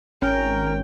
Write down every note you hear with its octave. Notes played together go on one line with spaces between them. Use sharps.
G#1 C#4 A#4 G5